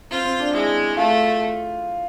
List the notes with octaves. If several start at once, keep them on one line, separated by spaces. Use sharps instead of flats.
C4 F4
C4
D4
G#3 E4
A3 F4